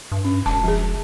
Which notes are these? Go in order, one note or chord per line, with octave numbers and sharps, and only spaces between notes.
G2
C#4
E1 A5
F3 G#4